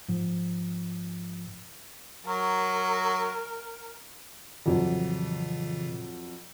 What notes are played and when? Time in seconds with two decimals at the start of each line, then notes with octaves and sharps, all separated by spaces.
0.09 G#2 F3
2.25 F#3 A#4
4.66 F2 A#2 C#3 E3 F#3